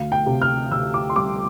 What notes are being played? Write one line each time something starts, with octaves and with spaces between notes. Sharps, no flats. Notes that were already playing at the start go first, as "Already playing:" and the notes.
Already playing: D2 F5
G5
C3
F6
D2 E6
D6
C6
G3 D6